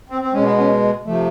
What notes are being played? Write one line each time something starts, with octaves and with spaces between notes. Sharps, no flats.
C4
C4
B2 G#3 C#4
B3
C#4
C3 F3 A3